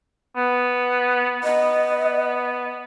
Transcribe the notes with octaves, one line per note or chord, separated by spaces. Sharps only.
B3
B3 D#5